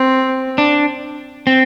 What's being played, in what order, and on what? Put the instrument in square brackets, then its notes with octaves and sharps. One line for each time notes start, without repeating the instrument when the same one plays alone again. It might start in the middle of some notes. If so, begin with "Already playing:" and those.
Already playing: [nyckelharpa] C4
[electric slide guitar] D4
C4